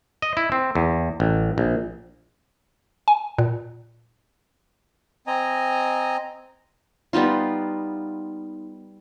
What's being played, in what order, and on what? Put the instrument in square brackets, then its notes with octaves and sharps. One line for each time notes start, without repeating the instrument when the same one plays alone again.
[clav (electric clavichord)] D#5
E4
C4
E2
A1
A#1
[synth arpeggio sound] G#5
A#2
[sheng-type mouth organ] C4 D#5 G#5 A#5
[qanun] G3 B3 D#4 F4